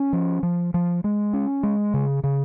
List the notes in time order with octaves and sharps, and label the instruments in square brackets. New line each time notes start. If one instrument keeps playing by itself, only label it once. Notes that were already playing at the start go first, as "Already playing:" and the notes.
Already playing: [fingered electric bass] C#4
F3
F3
F3
G#3
C#4
G#3
C#3
C#3